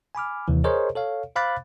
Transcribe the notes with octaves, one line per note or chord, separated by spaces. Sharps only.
G#5 B5 D6 F6
D#2 C3 E3
G#4 A#4 C5 C#5 D#5
A4 C#5 F5
C5 F5 B5 D6 F#6 A6